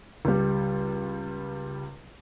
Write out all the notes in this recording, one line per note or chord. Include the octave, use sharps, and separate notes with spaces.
C#2 G3